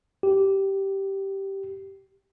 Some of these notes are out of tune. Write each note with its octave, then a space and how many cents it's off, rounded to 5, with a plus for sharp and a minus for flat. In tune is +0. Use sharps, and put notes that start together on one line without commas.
G4 -10